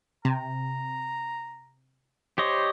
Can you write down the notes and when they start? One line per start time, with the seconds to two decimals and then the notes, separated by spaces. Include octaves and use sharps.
0.25 C3 A#5
2.38 G4 C5 C#5 D#5